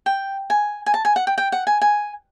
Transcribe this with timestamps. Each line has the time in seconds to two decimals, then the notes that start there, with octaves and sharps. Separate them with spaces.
0.06 G5
0.50 G#5
0.86 G#5
0.94 A5
1.05 G#5
1.16 F#5
1.27 G5
1.38 G5
1.52 F#5
1.67 G#5
1.82 G#5